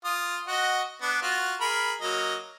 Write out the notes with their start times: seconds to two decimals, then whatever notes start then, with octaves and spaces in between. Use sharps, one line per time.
0.04 F4 D#6
0.48 F#4 D#5 F#5
1.02 B3 D4
1.22 F4 F#4
1.61 G#4 A#4 B5
2.01 F#3 A#3 D#5